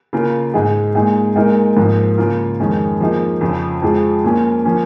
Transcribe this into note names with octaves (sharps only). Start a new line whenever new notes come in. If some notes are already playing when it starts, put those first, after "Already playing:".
C#3 A#3 F4 A#4
G#2 G#3 D#4 G#4
A#2 G#3 D#4 G#4
A#2 G#3 D#4 A#4
G#2 F3 A#3
C#3 A#3 F4 A#4
F2 D#3 G#3 C#4
F3 A#3 D#4 G#4
F2 C#3 F3
F2 F3 G#3 F4 G#4
A#2 A#3 C#4
F3 A#3 C#4